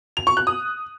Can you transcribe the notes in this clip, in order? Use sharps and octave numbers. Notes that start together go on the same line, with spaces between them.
F7
C#6
F#6
D#6